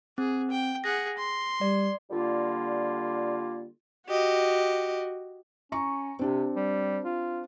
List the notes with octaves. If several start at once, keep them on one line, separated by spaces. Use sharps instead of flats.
C4 G#4
G5
G#4 F#5 A#6
C6
G3 D5
D3 G3 A#3 F4
F#4 G4 D#5
C#4 A#5 C#6
C3 C4 D4 G4
G3
F4